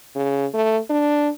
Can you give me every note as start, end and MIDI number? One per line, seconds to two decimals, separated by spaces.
0.15 0.47 49
0.54 0.79 57
0.90 1.30 62